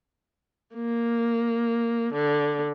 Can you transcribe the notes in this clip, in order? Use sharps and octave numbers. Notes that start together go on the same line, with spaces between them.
A#3
D3